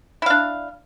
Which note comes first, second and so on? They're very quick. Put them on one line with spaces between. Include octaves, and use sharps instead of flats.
E4 F5 D4